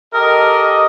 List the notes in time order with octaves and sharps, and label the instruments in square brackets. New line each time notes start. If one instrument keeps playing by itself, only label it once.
[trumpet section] G4 A4 D#5 [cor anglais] A#4